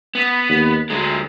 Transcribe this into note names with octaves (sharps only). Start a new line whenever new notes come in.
B3
D#2
D2 F#3 G#3